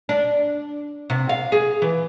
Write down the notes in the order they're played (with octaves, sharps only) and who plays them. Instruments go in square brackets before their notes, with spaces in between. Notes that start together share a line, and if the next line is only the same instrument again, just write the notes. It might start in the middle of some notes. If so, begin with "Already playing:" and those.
[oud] D4
C3
F5
G#4
E3